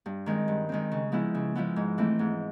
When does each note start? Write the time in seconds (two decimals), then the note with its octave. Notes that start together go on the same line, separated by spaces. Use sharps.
0.06 G2
0.26 D#3 G#3 C4
0.48 G2
0.69 D#3 G#3 C4
0.92 C#3
1.12 F3 G#3 B3 E4
1.35 C#3
1.55 F3 G#3 B3 E4
1.76 G#2
1.98 E3 A3 C4
2.19 G#2